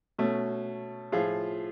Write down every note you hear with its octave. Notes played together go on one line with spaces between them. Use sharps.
B2 A3 C#4
A2 F3 F4 G#4